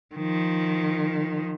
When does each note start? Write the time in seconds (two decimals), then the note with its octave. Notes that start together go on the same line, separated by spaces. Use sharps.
0.15 D#3 F3